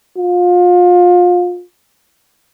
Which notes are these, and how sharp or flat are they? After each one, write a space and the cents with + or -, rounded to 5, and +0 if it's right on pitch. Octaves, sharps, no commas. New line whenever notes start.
F4 +30